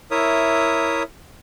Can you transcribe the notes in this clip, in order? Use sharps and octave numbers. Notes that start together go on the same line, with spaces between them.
E4 A#4 C#5 E5 D#6